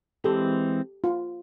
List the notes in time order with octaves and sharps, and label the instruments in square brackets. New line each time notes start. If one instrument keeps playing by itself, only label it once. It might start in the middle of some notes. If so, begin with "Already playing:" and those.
[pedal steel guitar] E3 G#3 C4 [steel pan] G4 A4
[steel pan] F4